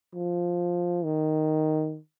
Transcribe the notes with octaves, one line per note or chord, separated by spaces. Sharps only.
F3
D#3